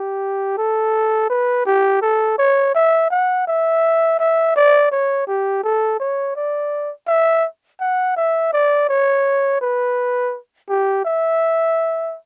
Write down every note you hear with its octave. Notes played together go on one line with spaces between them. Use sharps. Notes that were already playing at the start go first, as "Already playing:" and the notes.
Already playing: G4
A4
B4
G4
A4
C#5
E5
F#5
E5
E5
D5
C#5
G4
A4
C#5
D5
E5
F#5
E5
D5
C#5
B4
G4
E5